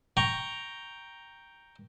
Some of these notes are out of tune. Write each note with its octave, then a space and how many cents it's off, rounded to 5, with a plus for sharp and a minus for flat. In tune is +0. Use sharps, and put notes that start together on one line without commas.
G5 +0 A#5 +0 C#6 +5